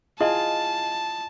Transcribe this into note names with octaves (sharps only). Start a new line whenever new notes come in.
E4 F4 G#4 D#5 A5